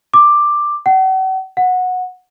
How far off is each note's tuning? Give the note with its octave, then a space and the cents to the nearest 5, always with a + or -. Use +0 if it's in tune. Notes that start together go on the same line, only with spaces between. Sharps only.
D6 +10
F#5 +40
F#5 -15